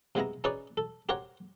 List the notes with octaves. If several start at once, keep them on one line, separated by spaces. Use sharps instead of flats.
C3 G#3 B3 E4 A#5
C#4 D#4 G#4 B4 C#5 D5
A4
G4 A#4 C5 C#5 F#5